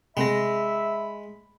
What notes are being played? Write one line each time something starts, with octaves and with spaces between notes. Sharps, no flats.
C3 G#3 C4 E5 B5 A#6